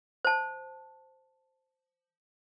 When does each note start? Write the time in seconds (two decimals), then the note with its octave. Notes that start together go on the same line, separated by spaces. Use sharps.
0.25 C5 A5